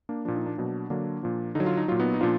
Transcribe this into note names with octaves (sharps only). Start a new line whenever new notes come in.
A#3 D4
A#2 F3 D4
D#4
A#3 D4
B2 F#3
D3 F#3 A#3 D4
A#2 F3
D3 F#3 D#4
F4
D#4
A#2 F#3 F4
B3 D#4
D#4
A#2 F3 D4 F4